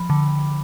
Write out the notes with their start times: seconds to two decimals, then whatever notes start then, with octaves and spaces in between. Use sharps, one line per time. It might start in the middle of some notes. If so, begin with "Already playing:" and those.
Already playing: F3 B5
0.10 D3